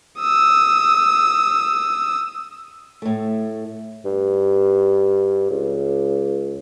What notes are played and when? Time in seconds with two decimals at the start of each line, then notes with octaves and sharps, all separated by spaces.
0.20 D#6 E6
3.02 A2 A3
4.05 G2
5.50 C#2